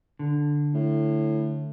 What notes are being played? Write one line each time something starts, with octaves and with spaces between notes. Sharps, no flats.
D3
A2